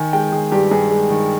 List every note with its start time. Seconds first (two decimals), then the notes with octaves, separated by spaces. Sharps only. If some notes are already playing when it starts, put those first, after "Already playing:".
Already playing: D#3 G#5
0.13 G#3 G5
0.32 D#3 G#4
0.52 G2 G4
0.71 G2 G#4
0.91 G#3
1.10 D#3